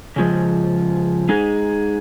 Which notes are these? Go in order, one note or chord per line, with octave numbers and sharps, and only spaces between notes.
C#3 F3 G#3
G#3 D#4 G#4